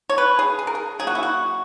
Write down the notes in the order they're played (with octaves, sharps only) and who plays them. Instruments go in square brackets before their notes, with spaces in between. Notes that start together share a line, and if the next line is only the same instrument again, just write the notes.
[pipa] C#5
B4
G#4
G#4
A#4
G#4
C#3 F#3 A#3 G#4
F#4
E4
F#4